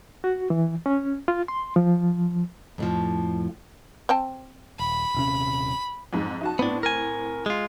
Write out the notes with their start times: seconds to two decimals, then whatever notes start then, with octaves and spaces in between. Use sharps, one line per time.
0.24 F#4
0.50 E3
0.86 C#4
1.28 F4
1.48 C6
1.76 F3
2.78 F2 A2 F3
4.09 C4 G5 A5
4.79 D#1 B5
5.14 D#1 C3 C#4
6.13 F2 G#2
6.41 D#4 F#4 A5
6.59 A2 B3 C4 D4
6.83 A#4 G#5
7.46 G#3 F4